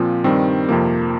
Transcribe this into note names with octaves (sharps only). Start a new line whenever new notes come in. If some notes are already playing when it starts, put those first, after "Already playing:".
Already playing: A#2 F3 C4
G2 D#3 G3 C4
F2 C3 F3 A#3